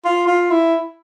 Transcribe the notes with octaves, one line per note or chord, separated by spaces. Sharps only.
F4
F4
E4